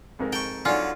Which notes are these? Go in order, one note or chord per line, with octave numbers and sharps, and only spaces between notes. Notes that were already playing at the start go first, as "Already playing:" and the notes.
F2 G#2 A#4
G5 A5 C#6
D3 F#3 D#4 F4 D5 G#5